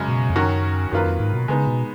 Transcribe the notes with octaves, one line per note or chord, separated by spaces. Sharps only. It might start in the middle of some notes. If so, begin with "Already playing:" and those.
Already playing: F#2 C#3 G#3
B2
F2
F#2 D#3 F#3 C#4 F#4
F#2 D#3 F#3 A#3 F4 B4
F2
G#2
B2
C#3 G#3 B3 D#4
B2